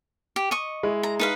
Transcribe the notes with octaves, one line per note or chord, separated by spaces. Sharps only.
G4
D#5 C#6
G#3 E4
A#5
D#4 B4 F5